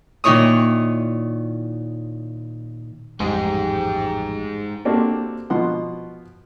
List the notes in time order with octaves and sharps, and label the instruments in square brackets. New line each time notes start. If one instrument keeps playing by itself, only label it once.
[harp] A#2 D#3 D#4 E4 C#5 D#6
[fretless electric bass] A1 F2 G3 [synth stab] G#2 [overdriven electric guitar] G#3 D#4 [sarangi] G4
[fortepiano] A#3 C4 D4 F#4 G4 A4
B2 F3 F#5 C6